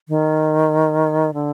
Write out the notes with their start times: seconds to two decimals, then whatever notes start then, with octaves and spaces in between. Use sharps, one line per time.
0.09 D#3
1.34 D3